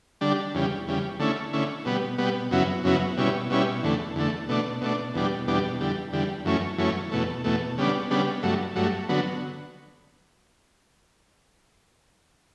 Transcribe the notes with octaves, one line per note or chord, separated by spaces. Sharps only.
D3 G3 D4
E2 C#3 G3
E2 C#3 G3
D3 A3 C#4 E4
D3 A3 C#4 E4
B2 G3 B3
B2 G3 B3
F#2 C#3 F#3 B3 E4
F#2 C#3 F#3 B3 E4
B2 G3 C#4 E4
B2 G3 C#4 E4
E2 D3 A3
E2 D3 A3
B2 A3 D4
B2 A3 D4
E2 B2 G3 D4
E2 B2 G3 D4
E2 D3 G3
E2 D3 G3
F#2 E3 A3 C#4
F#2 E3 A3 C#4
E2 B2 A3
E2 B2 A3
C#3 G3 B3 D4
C#3 G3 B3 D4
G2 F#3 A3
G2 F#3 A3
D3 F#3 B3